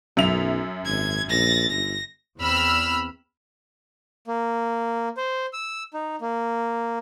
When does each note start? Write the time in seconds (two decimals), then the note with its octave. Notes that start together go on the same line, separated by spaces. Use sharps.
0.17 B1 F#2 E5 F7
0.85 G#1 G#6
1.29 A#1 A6 A#6
1.69 G1 A#6
2.39 E2 C4 B5 E6 F6
4.27 A#3
5.17 C5
5.53 E6
5.94 D#4
6.21 A#3